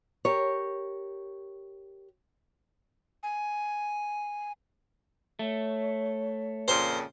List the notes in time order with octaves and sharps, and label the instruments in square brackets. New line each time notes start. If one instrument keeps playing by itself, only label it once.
[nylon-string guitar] G4 A#4 C#5
[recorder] G#5
[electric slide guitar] A3 [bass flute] C#5
[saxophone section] F2 A#2 C#3 [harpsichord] C5